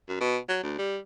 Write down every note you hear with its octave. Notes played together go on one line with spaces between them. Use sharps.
F#2
B2
F#3
D2
G3